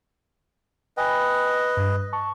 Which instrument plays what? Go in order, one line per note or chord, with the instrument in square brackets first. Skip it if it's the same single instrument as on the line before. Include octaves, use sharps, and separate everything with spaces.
[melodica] B4 D#5 [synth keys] G5 G#5 B5
[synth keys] G2
A5 C#6